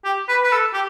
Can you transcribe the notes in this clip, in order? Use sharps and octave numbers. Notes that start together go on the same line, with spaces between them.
G4
B4
B4
A4
G4